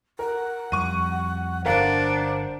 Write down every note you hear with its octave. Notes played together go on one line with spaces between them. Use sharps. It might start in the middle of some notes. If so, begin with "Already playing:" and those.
A#4 F#5
F2 G3 C#6 D#7
G1 D4 A#4 C5 F5 F#5